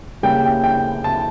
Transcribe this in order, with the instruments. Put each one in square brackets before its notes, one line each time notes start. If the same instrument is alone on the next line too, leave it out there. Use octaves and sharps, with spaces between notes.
[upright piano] C#3 G3 A#3 G5
G5
G5
A5